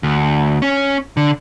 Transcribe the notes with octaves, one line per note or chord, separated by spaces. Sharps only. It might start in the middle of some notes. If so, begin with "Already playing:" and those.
D2
C#4
D3